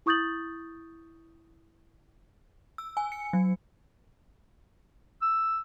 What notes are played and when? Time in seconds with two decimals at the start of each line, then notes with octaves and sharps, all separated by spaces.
0.06 E4 C#6 D#6 G6 A6 F#7
2.78 E6
2.97 G#5
3.12 C#7
3.33 F#3
5.22 E6